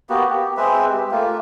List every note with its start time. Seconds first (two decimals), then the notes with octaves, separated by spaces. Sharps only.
0.09 A#3 B3 F#4 G4
0.30 G4
0.57 G#3 C4 B4 E5
0.89 G4
1.11 A3 A#3 F4